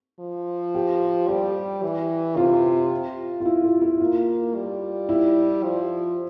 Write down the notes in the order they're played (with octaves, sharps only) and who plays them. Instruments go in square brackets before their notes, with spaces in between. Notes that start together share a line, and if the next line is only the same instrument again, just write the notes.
[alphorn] F3
[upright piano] G4
[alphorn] G3 [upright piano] G4
[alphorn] E3
[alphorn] C3 [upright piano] F4
[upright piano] F4
E4
F4
E4
[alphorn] A#3 [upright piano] F4
[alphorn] G3
[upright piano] E4
[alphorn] F3